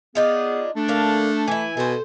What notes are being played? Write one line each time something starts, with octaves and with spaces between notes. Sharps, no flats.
B3 D4 D#4 F4 G#4
A3 D4
D3 A#3 F5
E3 E4 G#5
B2 A4 C5